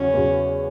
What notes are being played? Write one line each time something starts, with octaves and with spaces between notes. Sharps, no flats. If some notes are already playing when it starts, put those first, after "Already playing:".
Already playing: E2 C#3 F#3 C#4
E2 C#3 F#3